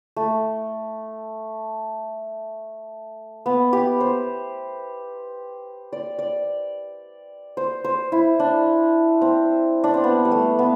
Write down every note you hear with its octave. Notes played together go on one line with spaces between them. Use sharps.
A3
B3
G4
C5
D5
D5
C5
C5
E4
D4
C4
D4
C4
B3
G3
A3
B3